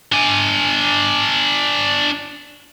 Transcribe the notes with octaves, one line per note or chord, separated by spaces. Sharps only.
D4 G#5